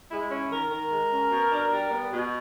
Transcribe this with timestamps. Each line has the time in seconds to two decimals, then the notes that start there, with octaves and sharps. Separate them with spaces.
0.11 G#3 E4
0.30 C#4 E4
0.50 D#3 A#4
0.70 D#3 A#4
0.91 G#3
1.11 C#4
1.31 B2
1.51 D4
1.71 G3
1.91 B3
2.12 B2